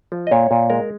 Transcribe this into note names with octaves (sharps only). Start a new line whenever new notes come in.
F3
D#5
A#2 C#5
A#2
G#3 A#4